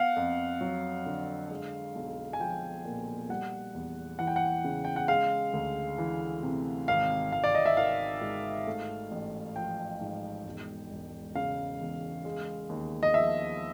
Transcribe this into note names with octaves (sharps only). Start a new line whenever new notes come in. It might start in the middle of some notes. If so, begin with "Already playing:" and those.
Already playing: B3 F5 F#5
F2
F#3
D3
G#3
B1
G#5
F3 G5
A#2
G3 F#5
E2
E3 F#5
G5
F#5
C#3
G5
F#5
G#3 F5
D2
E3
C3
G#1 F5
G#1 F5
D5
D#5
E5
D#3 F5
G#2
A3
A1
F3 G5
G#2
E1
E1
C#3 F5
E2
G#3
D#2
D#5
F3 E5